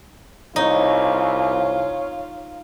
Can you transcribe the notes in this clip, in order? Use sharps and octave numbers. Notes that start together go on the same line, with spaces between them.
C2 D#4 F4 C#5